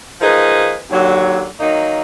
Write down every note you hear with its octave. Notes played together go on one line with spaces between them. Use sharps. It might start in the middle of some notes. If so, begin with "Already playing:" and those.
F3 A#3 D#4 G#4 B4
D#2 D3 F#3
D#3 F#3 A#3 D#4